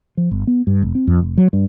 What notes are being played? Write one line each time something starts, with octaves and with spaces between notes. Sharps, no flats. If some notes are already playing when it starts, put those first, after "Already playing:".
F3
G1
B3
G2
F1
C4
F2
F1
F#3
G2